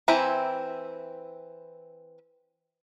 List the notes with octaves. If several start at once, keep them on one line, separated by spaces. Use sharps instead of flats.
E3 C4 E4 A#5